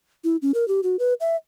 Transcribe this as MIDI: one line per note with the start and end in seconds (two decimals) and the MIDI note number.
0.24 0.37 64
0.42 0.52 61
0.54 0.67 70
0.68 0.81 67
0.83 0.96 66
0.99 1.14 71
1.20 1.36 76